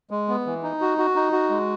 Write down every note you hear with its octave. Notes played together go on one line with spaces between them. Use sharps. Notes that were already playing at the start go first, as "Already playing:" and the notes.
G#3
B3
E3
D#4
F#4
F#4
D#4
F#4
G#3